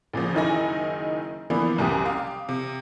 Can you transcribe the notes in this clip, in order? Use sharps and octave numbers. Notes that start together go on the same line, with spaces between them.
A#1 A#2 C#3 F3
F#1 D#3 D#4 E4 G#5 A#6
E3 F3 A#3 B3 D4 E4
C2 F#2 G4 D6 D#6
F5 G5
C3